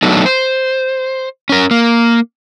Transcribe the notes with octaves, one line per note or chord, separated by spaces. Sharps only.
F#3 A3 B3 D4 D#4
C5
C#4 A#4
A#3